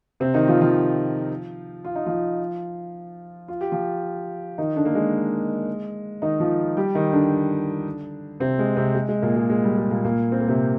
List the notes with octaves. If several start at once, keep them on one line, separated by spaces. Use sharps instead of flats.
C3 C4
D#3 D#4
F3 F4
F3 F4
F4
D#4
F3 F4
F4
G4
F3 F4
D#3 D#4
D3 D4
A#3
G#3
D#3 D#4
F3 F4
G3 G4
D#3 D#4
D3 D4
C3 C4
G#3
C3 C4
G#3
G#3
A#2 A#3
G#3
G#3
G3
G#3
A#2 A#3
A#2 A#3
C4
A#3
C3 C4